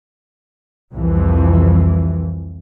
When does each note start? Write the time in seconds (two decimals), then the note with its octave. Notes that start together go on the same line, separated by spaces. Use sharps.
0.94 C2 F2 E3